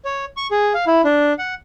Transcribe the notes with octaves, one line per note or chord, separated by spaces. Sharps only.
C#5
C#6
G#4
F5
E4
D4
F#5